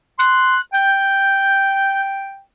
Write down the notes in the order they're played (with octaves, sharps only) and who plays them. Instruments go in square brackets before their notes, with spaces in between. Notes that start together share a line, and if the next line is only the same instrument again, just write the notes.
[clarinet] C6 [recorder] F#6
[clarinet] G5 [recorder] G6